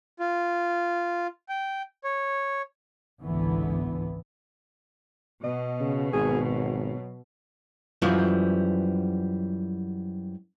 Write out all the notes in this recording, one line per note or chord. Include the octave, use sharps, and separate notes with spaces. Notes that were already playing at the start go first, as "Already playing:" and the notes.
F4
G5
C#5
G#1 C#2 D3 E3 B3
B2 D#5
C#3
G#1 G#4
F#3
F#2 E3 F3 G3